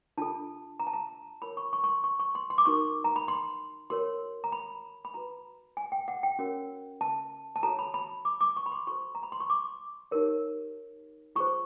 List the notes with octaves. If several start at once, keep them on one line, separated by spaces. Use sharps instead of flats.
D4 F4 A4 A5
A#5
A5
A#5
F4 A#4 C#5 B5
C#6
C#6
C#6
C6
C#6
C#6
C6
C6
D6
D#4 F#4 A#4 C#6
A#5
B5
C6
F#4 A#4 C#5 C6
A#5
B5
B5
F#4 B4 A#5
G#5
G5
F#5
G5
C#4 F#4 A#4 C#5
A5
A5
F#4 A4 C#5 A#5
B5
B5
D6
D6
C#6
B5
C6
F#4 A4 C5 C#6
A#5
B5
C6
C#6
D6
D#4 G4 A#4 C#5
F4 G#4 C5 C#6